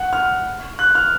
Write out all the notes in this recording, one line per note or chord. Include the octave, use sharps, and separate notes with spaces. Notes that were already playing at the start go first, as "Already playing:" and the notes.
Already playing: F#5
F6
F#6
F6